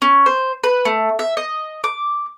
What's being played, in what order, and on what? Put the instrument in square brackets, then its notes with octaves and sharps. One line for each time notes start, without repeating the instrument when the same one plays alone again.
[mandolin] C#4
C5
B4
A3
E5
D#5
D6